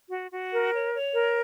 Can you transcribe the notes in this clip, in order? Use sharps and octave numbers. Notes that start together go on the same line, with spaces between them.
F#4
F#4
A#4
C#5
C#5
A#4